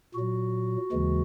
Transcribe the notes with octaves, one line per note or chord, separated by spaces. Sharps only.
A#2 F#3 F#4
D#2 C#3 E3 G#3